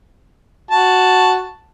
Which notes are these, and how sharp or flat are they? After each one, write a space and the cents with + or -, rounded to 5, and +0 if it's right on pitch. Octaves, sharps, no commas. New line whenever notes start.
F#4 +0 A5 +0